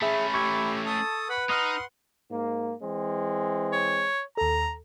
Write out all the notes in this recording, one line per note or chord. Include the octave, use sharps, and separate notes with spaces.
A3 C#4 G#4 E5 B5
G4 E5 C#6 G#6
A4 A5 D#6
B4 F#5 B5
D#4 F#5 C6 D#6 F6 F#6
G#2 A#3
E3 G#3 C4
C#5
D#2 A4 A#5